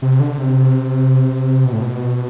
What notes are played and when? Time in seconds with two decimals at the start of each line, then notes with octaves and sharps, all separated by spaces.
0.02 C3
0.20 D3
0.38 C3
1.65 B2
1.73 A2
1.82 B2